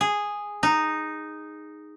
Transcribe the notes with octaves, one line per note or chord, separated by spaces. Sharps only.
G#4
D#4